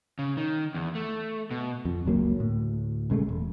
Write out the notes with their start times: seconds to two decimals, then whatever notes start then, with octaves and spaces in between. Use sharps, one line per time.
0.19 C#3
0.37 D#3
0.74 E2
0.95 A3
1.51 B2
1.85 F2
2.05 F#1 C#2 F#3 A#3
2.36 D2 A2
3.10 A#1 C#3 G#3 A3
3.29 E1